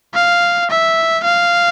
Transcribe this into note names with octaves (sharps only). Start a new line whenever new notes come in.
F5
E5
F5